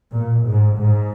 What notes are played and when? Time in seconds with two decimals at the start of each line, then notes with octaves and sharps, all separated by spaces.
0.13 A#2
0.45 G#2
0.77 G#2